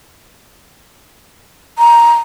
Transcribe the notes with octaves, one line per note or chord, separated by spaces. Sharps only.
A#5